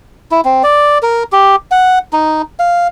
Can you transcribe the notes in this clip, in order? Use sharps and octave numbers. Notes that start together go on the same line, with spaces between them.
E4
C4
D5
A#4
G4
F#5
D#4
F5